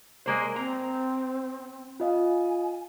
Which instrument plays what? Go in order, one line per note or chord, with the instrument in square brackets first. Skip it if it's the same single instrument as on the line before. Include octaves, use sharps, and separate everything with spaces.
[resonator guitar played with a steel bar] G#3 A#3 C5 [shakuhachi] A#4
[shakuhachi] C4 [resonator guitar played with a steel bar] A#5
[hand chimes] F4 D#5 F5 [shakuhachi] G#5